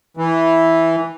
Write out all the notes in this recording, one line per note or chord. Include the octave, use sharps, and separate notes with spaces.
E3